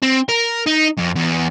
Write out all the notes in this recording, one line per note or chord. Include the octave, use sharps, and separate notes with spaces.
C4
A#4
D#4
F2
E2